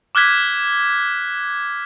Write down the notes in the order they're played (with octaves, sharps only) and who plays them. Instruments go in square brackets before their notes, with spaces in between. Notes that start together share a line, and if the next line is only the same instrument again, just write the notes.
[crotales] D6 F6 F#6 G#6 B6